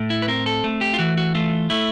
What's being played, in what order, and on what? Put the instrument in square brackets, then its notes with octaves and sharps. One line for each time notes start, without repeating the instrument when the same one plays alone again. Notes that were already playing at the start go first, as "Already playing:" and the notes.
Already playing: [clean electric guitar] A2 A3
E4
B4
C4 A#4
A4
A3
G4
F4
E3 F#4
F#4
A3 F4
A3 E4